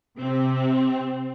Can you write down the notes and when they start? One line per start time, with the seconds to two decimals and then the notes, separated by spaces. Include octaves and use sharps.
0.18 C3 C4